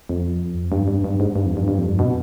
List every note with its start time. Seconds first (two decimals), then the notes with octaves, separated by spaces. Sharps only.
0.09 F2
0.72 G2
0.88 G2
1.04 G2
1.20 G#2
1.36 G2
1.46 F2
1.57 G2
1.68 G2
1.78 F2
1.88 G2
1.99 B2